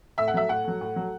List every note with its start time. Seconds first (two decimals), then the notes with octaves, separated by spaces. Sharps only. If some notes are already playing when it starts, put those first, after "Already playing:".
0.18 A2 E5
0.28 F#5
0.34 F#3 A3 E5
0.49 A2 F#5
0.64 F#3 A3
0.81 A2
0.96 F#3 A3